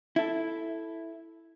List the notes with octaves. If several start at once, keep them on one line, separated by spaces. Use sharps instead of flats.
E4 A4